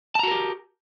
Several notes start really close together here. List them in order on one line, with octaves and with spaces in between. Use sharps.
A5 A#5 F#4 A#4 G4